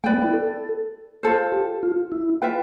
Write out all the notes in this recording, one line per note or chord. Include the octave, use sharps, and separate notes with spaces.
A3 B4 D5 G5
B3
E4
A4
F4 A4 C5
G4
F4
E4
F4 B4 E5 G5